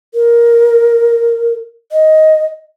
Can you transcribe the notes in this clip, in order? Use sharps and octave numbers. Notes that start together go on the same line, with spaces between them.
A#4
D#5